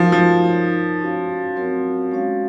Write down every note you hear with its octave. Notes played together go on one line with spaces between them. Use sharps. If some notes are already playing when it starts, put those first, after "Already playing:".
Already playing: F3 D#4 F#4 A#4 F5
F3
D#4 A#4 C#5
C#4 F#4 C#5 F5
F#3 C4 F#4 A#4 C#5
G#3 C#4 F#4 C#5 F5